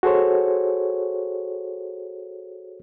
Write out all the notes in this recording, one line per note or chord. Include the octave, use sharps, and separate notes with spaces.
F#4 G#4 A4 C5 C#5